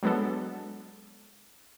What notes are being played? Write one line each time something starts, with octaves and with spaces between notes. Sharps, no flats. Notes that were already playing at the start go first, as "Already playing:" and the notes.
F#3 G#3 B3 D4 A4